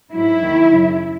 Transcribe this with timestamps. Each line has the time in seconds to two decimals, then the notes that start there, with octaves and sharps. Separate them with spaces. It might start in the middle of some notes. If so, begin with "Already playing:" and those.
0.12 G#2 F#3 E4
0.42 D#2 D#3 F#3
0.71 F#2 C#3 F#3